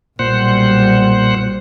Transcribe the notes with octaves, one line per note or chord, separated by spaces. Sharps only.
B1 A#2 G3 C5 F#5